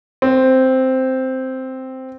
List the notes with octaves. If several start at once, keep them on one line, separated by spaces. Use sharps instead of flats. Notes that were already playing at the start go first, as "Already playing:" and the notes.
C4